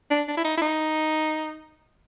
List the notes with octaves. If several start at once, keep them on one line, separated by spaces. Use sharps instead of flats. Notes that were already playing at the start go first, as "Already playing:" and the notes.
D4
D4
E4
D#4
E4
D#4